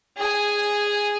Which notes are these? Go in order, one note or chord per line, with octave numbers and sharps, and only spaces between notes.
G#4 G#5